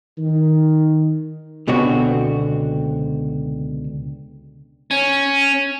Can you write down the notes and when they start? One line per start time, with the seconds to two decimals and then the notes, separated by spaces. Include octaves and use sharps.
0.18 D#3
1.68 C#2 B2 D3 C4 F#4
4.91 C#4